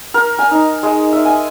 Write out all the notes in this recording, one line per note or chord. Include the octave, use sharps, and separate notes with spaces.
A#4
G#5
D#4
G#3
E5
G#5